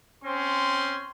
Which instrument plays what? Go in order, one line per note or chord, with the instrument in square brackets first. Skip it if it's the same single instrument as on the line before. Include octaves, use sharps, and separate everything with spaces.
[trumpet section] C4 C#4 C6